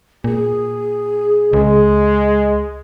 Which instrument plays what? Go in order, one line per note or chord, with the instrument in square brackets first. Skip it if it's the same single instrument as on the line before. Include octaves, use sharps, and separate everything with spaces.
[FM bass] A#2 [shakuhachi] G#4
[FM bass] C#2 [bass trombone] G#3